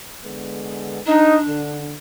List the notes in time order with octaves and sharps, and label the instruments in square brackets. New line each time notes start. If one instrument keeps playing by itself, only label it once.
[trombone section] D3 G#3 B3
[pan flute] D4 [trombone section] D#4
[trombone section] D3